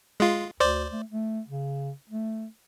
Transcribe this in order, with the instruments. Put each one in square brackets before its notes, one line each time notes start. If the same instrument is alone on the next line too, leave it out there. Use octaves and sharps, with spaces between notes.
[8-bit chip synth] G#3 F4
[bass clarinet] D2 [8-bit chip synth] C5 D5
[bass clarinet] A3
A3
C#3
A3